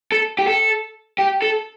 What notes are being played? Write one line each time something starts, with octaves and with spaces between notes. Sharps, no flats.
A4
G4
A4
G4
A4